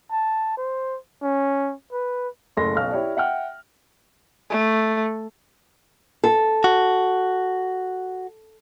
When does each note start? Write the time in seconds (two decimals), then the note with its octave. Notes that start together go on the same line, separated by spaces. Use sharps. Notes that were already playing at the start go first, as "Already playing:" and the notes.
0.11 A5
0.57 C5
1.22 C#4
1.92 B4
2.57 F#1 A2 A3 A4 C6 A#6
2.75 B1 B2 F5 F6
2.92 E4 G4 C#5 D5
3.17 E5 F#5 G5 F6
4.50 A3
6.24 A4
6.64 F#4